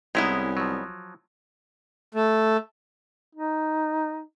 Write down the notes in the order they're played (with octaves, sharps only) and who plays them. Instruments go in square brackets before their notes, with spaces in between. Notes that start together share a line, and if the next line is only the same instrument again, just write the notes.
[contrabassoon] C2 [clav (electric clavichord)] G#3 E4 [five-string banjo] B3 C#4 D#4
[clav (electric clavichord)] F3 F#3
[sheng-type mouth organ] A3
[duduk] D#4